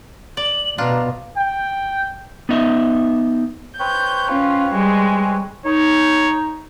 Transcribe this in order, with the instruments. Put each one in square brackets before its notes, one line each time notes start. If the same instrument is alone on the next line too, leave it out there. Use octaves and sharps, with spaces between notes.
[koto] D5 [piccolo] F#7
[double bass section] B2 [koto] D4 F4 [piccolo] A#5
[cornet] G5
[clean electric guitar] B3 D#4 D#5 E5
[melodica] C4 B4 C#5 [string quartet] G6
[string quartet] C#4 F4
G3 G#3
[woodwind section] D#4 [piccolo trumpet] C#5